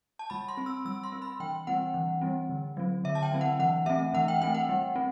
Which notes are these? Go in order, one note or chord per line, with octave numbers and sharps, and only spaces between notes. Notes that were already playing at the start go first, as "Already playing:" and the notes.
A5
G3 B5
C6
C4
E6
G3 E6
C6
C4
B5
E3 G5
G3 C4 F#5
E3
G3 C4
D3
F#3 C4
D3 E5
A5
G5
F#3 C4
F#5
E3 F#5
A3 C4 E5
E3 F#5
G5
A3 C4 G5
F#5
G3
C4